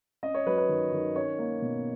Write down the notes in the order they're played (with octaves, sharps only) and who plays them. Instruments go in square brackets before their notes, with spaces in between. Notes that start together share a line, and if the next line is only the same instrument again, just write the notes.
[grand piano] C#4 D#5
C#5
F#3 B4
B4
D#3
D#3
C#4 C#5
A#3
B2